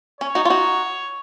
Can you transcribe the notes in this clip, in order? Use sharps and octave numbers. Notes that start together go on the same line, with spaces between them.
C#4 C#5
D#4 F#4
F4
D#4 F#4